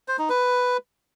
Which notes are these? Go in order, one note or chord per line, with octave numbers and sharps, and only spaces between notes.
C5
D#4
B4